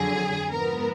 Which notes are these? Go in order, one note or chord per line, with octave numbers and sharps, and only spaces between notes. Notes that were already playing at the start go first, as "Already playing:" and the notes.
Already playing: F2 D3 F#3 G#4
G#2 F3 B3 A#4